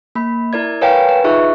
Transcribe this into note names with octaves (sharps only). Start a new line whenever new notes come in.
A#3 B5
E4 A#4 D5 G#6
A#4 B4 C#5 F5 G5 G#5
B4
D#4 F4 G#4 E5 C#6 F#6